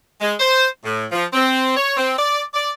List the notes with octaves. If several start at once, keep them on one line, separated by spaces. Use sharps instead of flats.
G#3
C5
A2
F3
C4
C#5
C4
D5
D5